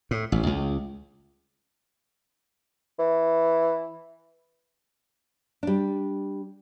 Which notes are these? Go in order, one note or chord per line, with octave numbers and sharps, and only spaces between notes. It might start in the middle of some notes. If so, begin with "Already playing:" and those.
A2
A1
C#2
E3
G3 D4